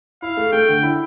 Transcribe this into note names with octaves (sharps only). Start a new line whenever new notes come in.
E4 F5
A3
A3 G5
D3
E4